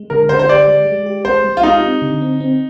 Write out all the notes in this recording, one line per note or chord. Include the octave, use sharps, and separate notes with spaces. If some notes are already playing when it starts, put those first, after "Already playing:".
Already playing: G#3
D3 A#4
D3 C5
C5
G4 D5
G#3
G#3
G4
G#3 C5
G#3
F4
D#4 G4
C4
D3
C4
C4